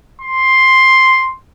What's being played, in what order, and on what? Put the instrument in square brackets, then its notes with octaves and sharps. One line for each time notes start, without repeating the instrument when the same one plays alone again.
[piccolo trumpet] C6